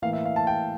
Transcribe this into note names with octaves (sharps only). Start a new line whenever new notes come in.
A2 E3 A#3 E4 F5
E5
F5
A5
G5